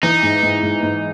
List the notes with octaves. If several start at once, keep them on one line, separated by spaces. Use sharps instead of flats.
E3 D#4
G#2
G#2
G#2
G#2